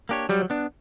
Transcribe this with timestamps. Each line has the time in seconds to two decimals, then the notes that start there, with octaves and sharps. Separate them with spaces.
0.09 A#3 D4 G4 C#5
0.29 F#3 G3
0.50 B3 D4